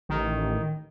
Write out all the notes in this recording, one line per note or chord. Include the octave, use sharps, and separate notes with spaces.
A1 D#3